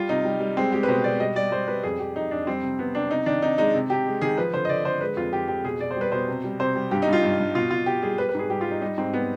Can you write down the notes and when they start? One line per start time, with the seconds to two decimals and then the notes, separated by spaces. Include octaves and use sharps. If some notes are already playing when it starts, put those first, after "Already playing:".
Already playing: G3 F4
0.09 C3 D#4
0.25 G3
0.40 G3
0.56 G#3 C4
0.72 G#3 G4
0.83 B4
0.88 B2 C5
1.04 B2 D5
1.20 G3 D#5
1.36 G3 D5
1.51 G3 C5
1.68 G3 B4
1.83 F2 G#4
1.99 F2 G4
2.15 F2 D#4
2.31 F2 D4
2.47 G3 C4
2.62 C3
2.79 C3 B3
2.95 C3 D4
3.10 C3 D#4
3.26 D#3 D4
3.42 C3 D#4
3.58 G#3 D#4
3.74 C3
3.90 C3 G4
4.06 G#3
4.21 D#3 G#4
4.38 F3 B4
4.54 D3 C5
4.65 D#5
4.69 D3 D5
4.85 D3 C5
5.01 G#3 B4
5.17 F2 F4
5.33 F2 G4
5.48 F2 G4
5.64 B2 G#4
5.80 B2 D5
5.91 C5
5.96 G3 B4
6.12 B2 C5
6.28 C3
6.44 G3
6.60 C3 C5
6.76 G3
6.91 G2 G4
7.02 D#4
7.07 G2
7.13 F4
7.23 G2
7.39 G2
7.55 B2 F4
7.71 B2 F4
7.86 B2 G4
8.03 G3 G#4
8.18 G3 B4
8.29 B4
8.35 G#2 G#4
8.50 G3 G4
8.61 F4
8.66 G3 D#4
8.82 G3 D#4
8.97 G#2 C4
9.13 G3 B3